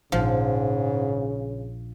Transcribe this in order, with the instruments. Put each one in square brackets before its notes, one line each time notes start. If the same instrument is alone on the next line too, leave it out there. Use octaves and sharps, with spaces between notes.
[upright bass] A#1 [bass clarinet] G#2 [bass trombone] C#3 [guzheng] F3